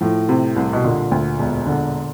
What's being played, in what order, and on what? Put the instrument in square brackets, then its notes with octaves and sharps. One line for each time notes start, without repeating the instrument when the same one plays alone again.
[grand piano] A2 [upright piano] F3
[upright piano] C3
C2
[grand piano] B2
[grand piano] A#2 [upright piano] D3
[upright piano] D2
E1
D3